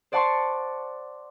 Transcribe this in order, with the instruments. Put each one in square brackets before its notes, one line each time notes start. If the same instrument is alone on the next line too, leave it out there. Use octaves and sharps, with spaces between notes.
[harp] C5 D5 F#5 A5 C6 C#6